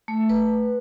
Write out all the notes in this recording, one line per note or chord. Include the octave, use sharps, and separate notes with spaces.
A3
B4